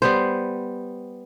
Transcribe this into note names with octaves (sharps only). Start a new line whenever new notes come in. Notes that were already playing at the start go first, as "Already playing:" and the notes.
G3 B3 C5